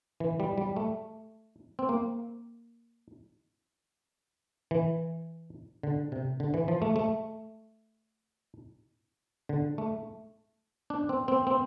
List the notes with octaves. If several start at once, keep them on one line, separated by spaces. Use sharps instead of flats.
E3
G3
G3
A3
C4
A#3
E3
D3
C3
D3
E3
F3
A3
A3
D3
A3
D4
C4
C4
C4